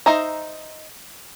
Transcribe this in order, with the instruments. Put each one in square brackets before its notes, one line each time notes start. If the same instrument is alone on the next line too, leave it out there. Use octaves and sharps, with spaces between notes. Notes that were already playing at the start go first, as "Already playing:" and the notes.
[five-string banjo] D#4 C5 D#5 E5 A#5